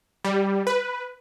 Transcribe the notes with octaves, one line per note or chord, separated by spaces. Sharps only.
G3
B4